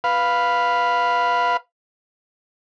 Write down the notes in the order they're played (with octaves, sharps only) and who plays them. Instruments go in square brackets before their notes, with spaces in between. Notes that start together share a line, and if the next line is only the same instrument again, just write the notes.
[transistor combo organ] B4 F5